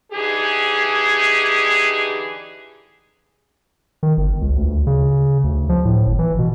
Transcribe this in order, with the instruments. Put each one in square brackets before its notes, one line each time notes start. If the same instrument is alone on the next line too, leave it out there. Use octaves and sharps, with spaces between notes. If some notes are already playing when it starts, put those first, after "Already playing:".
[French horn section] D3 E3 D#4 G4 G#4
[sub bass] D#3
G1
C#2
D2
C#3
D2
F3
A2
G1
E3
B2